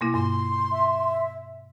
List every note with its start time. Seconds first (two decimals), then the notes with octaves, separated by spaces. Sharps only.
0.01 B2 A#3 E4
0.14 G2 C6
0.72 E5